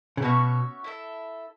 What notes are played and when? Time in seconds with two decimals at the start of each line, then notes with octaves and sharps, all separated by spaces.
0.17 C#3
0.22 B2 C#4 F#4 C#5 E5
0.84 E4 A4 E5